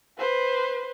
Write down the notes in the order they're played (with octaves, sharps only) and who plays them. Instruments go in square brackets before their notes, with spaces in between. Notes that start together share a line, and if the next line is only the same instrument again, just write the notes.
[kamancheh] B4 C5